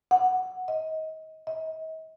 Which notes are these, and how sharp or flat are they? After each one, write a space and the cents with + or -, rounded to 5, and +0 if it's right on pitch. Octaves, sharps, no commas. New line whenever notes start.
F#5 +0
D#5 +30
D#5 +45